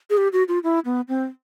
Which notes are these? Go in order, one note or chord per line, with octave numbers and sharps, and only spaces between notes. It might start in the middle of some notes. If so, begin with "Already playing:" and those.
G#4
G4
F#4
F4
E4
B3
C4